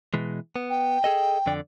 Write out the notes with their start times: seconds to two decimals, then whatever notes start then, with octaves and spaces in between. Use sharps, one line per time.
0.14 B2 E3 G#3
0.56 B3
0.70 G5
1.04 G#4 A4 D#5
1.47 F2 D3 D5